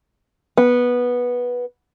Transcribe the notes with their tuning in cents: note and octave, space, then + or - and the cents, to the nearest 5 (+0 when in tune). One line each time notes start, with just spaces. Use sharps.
B3 -10